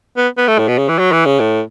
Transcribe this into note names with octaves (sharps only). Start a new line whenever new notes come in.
B3
B3
A3
A2
B2
C#3
E3
F#3
E3
C#3
A2